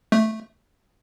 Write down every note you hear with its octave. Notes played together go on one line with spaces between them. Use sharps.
A3